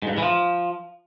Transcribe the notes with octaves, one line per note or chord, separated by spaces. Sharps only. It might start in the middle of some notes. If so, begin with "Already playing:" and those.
G#2
G2
G#2
E3
F3